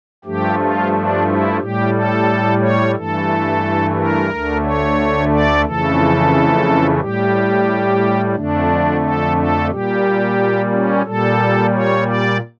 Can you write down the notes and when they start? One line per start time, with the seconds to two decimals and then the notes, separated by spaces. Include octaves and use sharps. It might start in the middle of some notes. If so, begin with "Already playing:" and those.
0.25 G2 F3 A3 G4
0.58 F4
0.93 D4
1.26 E4
1.60 A2 G3 G4
1.93 A4
2.61 C#5
2.95 G2 E3 A3 A4
3.96 A#4
4.30 D2 D3 A3
4.63 C#5
5.31 D5
5.65 F2 C#3 E3 A3 A4
7.00 A2 G3 G4
8.35 F2 D3 A3 D4
9.03 A4
9.37 A4
9.70 A#2 G3 G4
10.72 C#4
11.05 A#2 G3 A4
11.73 C#5
12.07 D5